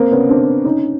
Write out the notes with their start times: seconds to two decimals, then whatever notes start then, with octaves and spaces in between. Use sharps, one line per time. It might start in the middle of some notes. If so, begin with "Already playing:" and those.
Already playing: A#3 C4
0.11 B3 C#4
0.29 C4 D4
0.65 C#4 D#4